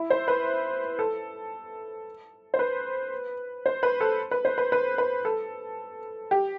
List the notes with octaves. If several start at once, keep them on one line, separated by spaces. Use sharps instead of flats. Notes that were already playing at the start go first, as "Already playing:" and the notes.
Already playing: E4
C5
B4
A4
C5
B4
C5
B4
A4
B4
C5
B4
B4
B4
A4
G4